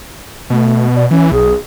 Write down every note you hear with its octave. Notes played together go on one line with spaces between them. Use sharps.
B2 A3
D5
E3 C#4
B1 G#4